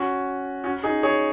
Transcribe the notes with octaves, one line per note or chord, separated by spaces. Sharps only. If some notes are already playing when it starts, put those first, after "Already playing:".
Already playing: C#4 F#4
C#4 F#4
D#4 G#4
G#4 C#5